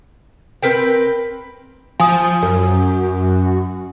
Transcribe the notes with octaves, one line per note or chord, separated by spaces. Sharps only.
C4 A#4 B4 G5
F3 G#5 D#6
F#2